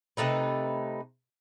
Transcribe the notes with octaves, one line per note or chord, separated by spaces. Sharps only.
C3 A3 D#4 B4